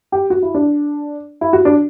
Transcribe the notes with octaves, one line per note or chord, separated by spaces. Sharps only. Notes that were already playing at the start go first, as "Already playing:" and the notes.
G4
F#4
E4
D4
E4
F#4
D4